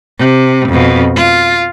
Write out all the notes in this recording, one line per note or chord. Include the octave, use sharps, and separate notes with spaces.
C3
F2 B2
F4